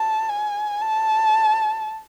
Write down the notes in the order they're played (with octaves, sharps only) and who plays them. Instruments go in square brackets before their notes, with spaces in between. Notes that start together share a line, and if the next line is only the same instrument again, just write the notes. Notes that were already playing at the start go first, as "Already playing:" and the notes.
Already playing: [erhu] A5
G#5
A5